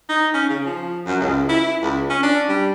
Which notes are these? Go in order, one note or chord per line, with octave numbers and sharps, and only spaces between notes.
D#4
C#4
C#3
F3
F#2
C#2
E4
C#2
C#4
D4
G3